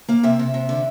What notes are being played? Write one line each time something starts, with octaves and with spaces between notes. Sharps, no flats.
A#3 F5
C3 E5
C3
C3
D3